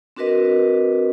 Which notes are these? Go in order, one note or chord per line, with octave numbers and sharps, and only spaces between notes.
C4 D4 F#4 A#4 B4 D#5